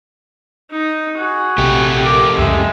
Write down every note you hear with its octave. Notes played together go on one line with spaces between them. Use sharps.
D#4
F#4 G#4
A#1 C3 A3 G4
A#4 D6
C#2 F#2 C#3 G#3 E5